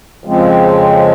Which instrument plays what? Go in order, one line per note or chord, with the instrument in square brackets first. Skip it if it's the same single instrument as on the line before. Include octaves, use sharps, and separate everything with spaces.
[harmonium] F2 C#3 F3 G#3 C4